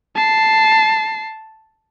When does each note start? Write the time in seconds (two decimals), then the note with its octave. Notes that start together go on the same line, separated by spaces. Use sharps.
0.15 A5 C7